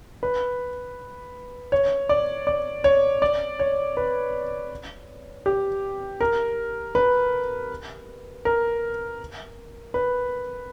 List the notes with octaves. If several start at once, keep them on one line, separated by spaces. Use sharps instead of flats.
B4
C#5
D5
D5
C#5
D5
C#5
B4
G4
A#4
B4
A#4
B4